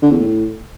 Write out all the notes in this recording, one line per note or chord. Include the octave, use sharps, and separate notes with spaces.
D3
E2
A2